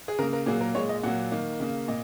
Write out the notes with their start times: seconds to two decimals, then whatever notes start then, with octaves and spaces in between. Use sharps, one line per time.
0.08 G#4
0.19 C#3 A#4
0.23 A#3
0.33 A#4
0.46 A#2 F#3 A#3 G#4
0.61 A#4
0.75 A#2 G#3 C#5
0.89 D#5
1.03 A#2 F#3 A#3 F#5
1.32 D#3 A#3
1.60 C#3 A#3
1.88 A#2 D#5